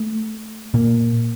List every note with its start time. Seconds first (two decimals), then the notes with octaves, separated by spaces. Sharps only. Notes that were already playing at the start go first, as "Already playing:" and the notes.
Already playing: A3
0.74 A#2 A#3